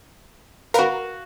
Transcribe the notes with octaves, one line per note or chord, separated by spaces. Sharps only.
F#4 A#4 B4 F5